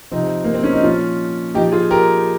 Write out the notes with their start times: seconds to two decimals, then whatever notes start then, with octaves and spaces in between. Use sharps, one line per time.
0.11 C3 F3 C4 D#4
0.44 A#3
0.54 C4
0.63 C#4
0.73 D#4
0.83 A#2 F3 C#4 F4
1.54 A#2 F3 D#4 G4
1.72 F4 G#4
1.90 G4 A#4